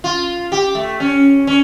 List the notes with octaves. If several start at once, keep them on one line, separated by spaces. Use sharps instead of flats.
F4
G4
A3
C#4
C#4